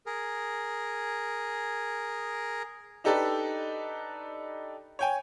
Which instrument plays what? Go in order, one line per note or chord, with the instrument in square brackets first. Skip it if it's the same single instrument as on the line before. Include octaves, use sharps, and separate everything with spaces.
[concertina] G#4 A#4
[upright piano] D4 D#4 G4 A4 B4 D5
C#5 G5 G#5